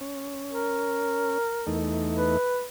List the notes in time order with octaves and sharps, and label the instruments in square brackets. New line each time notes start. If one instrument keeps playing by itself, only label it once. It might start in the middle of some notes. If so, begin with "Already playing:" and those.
[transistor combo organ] C#4
[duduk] A#4
[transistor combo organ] E2 A3 D#4
[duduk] B4